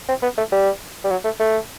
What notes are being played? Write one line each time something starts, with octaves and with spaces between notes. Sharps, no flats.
C4
B3
A3
G3
G3
F#3
A3
A3